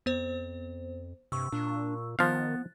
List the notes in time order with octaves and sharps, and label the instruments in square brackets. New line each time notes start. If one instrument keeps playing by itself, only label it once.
[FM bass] F2 [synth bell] B3 C5
[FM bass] G2 [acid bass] C3 [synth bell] C#6 E6
[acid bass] A#2 [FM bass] D4
[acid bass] D#3 [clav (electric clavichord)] F3 F5 [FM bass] B3 [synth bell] F#6 A6